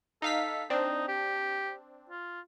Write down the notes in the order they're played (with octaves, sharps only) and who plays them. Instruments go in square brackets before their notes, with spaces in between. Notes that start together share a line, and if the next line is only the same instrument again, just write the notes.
[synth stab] D#4 F5 B6 [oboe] A4
[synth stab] C4 D4 [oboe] D#4
[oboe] G4
F4